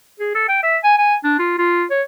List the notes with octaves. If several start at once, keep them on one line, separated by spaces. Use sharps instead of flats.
G#4
A4
G5
E5
G#5
G#5
D4
F4
F4
C#5